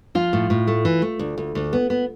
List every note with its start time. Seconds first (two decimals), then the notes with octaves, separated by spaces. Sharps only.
0.15 F3 F4
0.33 A2
0.50 A2
0.67 A3
0.85 E3
1.02 A3
1.19 D2
1.38 D2
1.55 D2
1.73 B3
1.90 B3